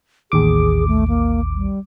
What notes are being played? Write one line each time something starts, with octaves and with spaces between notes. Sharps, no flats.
A1 D#2 G#4 D6
A3
A#3
G3